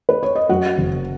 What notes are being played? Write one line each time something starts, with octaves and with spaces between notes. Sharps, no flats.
B4
C#5
D#5
F#2 F#4 F#5
F#1